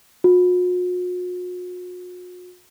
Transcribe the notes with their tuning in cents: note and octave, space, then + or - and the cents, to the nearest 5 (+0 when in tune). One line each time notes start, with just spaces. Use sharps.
F#4 -45